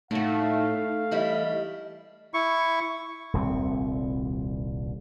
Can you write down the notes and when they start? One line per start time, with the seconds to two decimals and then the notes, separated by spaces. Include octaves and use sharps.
0.11 A2 A3 D#4 F#4 F5
1.11 E3 G3 E4 D#5
2.34 E4 C#6
3.33 D#1 C2 D3 C4